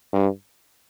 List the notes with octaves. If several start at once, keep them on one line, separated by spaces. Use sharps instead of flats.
G2